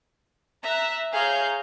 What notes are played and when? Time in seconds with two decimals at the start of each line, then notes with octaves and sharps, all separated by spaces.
0.62 E5 A#5 F#6
1.13 G#4 C#5 F5 A#5 G6